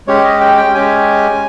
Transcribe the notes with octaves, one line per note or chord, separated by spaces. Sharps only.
G#3 C#4 G4 C#5
D#5
G5
G5
G#3 C#4 G4 G#5